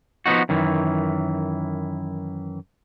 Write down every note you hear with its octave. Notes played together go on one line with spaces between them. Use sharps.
F3 B3 D#4 F#4
F#2 D#3 E3